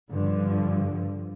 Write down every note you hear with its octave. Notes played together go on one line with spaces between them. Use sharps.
G2 D3 F3